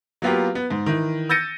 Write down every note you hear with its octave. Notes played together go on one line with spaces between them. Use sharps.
F#3 A#3 B3 F4 G4
B3
G#2
D#3 E3
E6 G6 A6 A#6 C#7 D#7